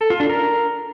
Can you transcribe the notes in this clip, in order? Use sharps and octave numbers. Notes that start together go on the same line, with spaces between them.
A4
F4
D4
A#4